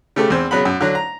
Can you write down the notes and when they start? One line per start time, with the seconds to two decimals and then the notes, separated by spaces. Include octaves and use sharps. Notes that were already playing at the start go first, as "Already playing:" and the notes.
0.16 C#3 A3 G4 A4
0.30 E2 C4
0.51 C#3 F#3 B3 B5
0.65 F#2
0.81 D3 F#3
0.95 A#5